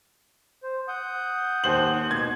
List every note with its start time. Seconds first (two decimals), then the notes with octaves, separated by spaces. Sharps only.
0.63 C5
0.88 F#5 D#6 G6
1.64 D#2 C5 F#7
2.11 B2 G#6